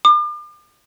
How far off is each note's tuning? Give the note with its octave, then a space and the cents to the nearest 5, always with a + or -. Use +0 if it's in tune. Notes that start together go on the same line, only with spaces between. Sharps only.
D6 +40